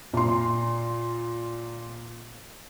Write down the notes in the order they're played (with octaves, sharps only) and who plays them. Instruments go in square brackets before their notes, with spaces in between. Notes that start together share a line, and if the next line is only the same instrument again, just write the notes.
[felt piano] A#2 C6